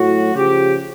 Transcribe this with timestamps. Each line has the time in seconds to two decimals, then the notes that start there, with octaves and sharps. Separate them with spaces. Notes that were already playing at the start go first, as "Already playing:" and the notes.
Already playing: A2 F#3 F#4
0.35 C#3 F3 G4